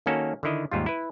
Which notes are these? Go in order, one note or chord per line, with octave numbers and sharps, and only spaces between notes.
D#3 A#3 C#4 F#4 A4
D3 D#3 E4 D#5
D#2 G#2 G3 F4
E4 B4